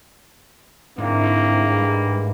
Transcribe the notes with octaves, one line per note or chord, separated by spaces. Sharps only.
G#2 D3 A#3 C4 D4 E4
E3 G3 G#3